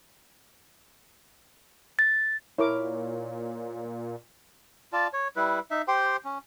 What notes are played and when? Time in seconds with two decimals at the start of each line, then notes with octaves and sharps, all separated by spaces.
1.99 A6
2.58 A#2 E4 A#4 C#5 D6
4.93 F4 D5 A5
5.13 C#5
5.36 G3 E4 B4
5.71 D#4 E5
5.88 G4 C5 G5 C6
6.24 C#4